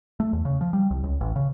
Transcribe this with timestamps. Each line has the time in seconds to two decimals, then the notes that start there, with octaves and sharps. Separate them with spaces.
0.20 A3
0.33 E2
0.45 C#3
0.61 F3
0.73 G3
0.91 C2
1.03 C#2
1.21 A1
1.36 C#3